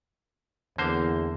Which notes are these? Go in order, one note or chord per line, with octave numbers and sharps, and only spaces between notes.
E2 D3 A#3 C5